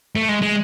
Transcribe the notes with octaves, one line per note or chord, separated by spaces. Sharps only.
A3
G#3
G#3